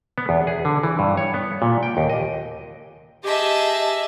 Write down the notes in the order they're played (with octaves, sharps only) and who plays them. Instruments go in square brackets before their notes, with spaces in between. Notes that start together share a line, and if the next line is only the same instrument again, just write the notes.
[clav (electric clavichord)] B3
E2
G#4
D3
E3
G2
C#5
B3
A#2
G5
D#2
D#5
[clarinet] G4 [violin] G#4 E5 [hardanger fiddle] D#5 A5